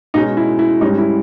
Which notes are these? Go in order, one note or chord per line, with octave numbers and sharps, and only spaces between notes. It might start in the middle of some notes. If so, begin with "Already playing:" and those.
B2 G#3 C#4 D#4
E4
E4
G#2 G3 C#4 D#4
E4